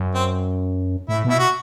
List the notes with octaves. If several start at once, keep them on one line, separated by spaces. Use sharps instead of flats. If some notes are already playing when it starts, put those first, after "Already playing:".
Already playing: F#2
C4
A2 E4
B2
E4
F#4